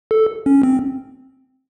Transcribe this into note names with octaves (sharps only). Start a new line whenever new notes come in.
A4
C#4
C4